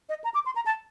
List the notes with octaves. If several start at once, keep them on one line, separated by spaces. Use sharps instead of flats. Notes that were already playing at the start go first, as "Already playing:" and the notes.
D#5
A#5
D6
C6
A#5
A5